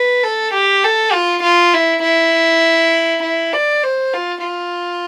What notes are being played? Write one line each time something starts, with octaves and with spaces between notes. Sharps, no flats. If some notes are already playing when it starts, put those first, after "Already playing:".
Already playing: B4
A4
G4
A4
F4
F4
E4
E4
E4
D5
C5
F4
F4